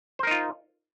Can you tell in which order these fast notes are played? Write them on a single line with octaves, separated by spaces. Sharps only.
C5 A#4 D#4 F4